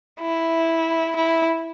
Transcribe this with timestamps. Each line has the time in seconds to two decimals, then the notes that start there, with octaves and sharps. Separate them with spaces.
0.21 E4
1.16 E4